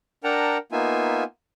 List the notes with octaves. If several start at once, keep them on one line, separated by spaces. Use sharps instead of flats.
D4 A#4 F#5 G5 A5 A#5
A#3 B3 D#4 F4 E5 G#5